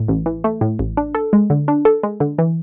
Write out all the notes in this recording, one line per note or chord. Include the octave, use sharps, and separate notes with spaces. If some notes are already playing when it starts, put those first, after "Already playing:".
Already playing: A2
A1
E3
A3
A2
A1
D4
A4
G#3
D3
D4
A4
G#3
D3
E3